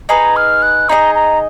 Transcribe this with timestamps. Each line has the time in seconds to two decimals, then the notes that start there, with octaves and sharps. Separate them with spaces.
0.09 D#4 G#4 B4 D#5 A#5
0.36 F6
0.63 F#6
0.89 D#4 G#4 B4 D#5 A#5
1.15 A#5